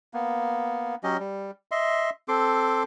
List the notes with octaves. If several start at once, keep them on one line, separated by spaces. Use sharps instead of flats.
A#3 B3
F#3 C#4 G4 D#5
G3
D#5 E5 C6
C4 A4 C6 D6